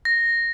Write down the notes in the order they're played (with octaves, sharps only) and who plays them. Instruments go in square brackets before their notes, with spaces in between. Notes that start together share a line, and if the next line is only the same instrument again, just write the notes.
[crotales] A#6